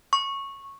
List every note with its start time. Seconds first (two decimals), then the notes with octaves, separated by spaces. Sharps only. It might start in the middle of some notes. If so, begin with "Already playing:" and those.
0.13 C#6